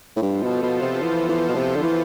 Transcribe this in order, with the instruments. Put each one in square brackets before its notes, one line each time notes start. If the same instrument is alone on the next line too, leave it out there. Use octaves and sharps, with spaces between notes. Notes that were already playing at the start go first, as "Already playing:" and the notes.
[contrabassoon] A2
[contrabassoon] G2 [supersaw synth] F3 B3 F4 A4 C5
[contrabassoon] B2
B2
C3
E3
E3
B2
C3
D3
E3